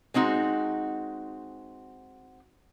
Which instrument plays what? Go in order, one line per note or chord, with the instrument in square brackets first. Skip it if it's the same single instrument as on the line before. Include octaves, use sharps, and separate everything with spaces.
[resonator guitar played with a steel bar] G#3 C4 D#4 F#4